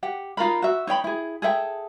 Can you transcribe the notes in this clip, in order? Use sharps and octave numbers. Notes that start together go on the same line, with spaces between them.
G4 F#5
D#4 F4 A#4 B5
F#4 E5
D#4 C#5 G5 B5
E4 G#4
G#4 A4 E5 G5